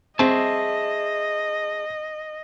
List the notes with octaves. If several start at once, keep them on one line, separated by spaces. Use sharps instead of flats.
C4 G#4 D#5 E5 A5